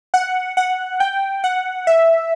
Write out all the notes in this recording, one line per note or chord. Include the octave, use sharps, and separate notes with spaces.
F#5
F#5
G5
F#5
E5